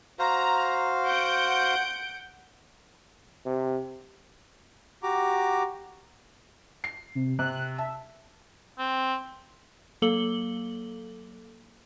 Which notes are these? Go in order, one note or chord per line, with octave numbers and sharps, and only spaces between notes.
F#4 C5 F5 A#5
F#5 G6 D7
C3
F#4 G4 A#5 D6
C7
C3
C3 F#6
E5 A5
C4
F#3 A#3 A4 F#7 G7